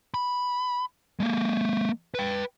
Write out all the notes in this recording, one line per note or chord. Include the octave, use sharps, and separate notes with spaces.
B5
G#3 A#3
B4 G5